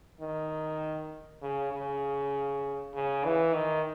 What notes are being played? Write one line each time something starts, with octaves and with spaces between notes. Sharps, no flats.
D#3
C#3
C#3
C#3
E3
D#3